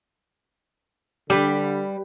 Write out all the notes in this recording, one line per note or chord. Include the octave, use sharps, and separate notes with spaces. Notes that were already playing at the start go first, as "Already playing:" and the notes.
D3 G3 G4 B4